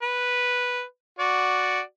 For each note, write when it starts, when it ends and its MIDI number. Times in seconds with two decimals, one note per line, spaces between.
0.02 0.82 71
1.19 1.81 66
1.19 1.81 74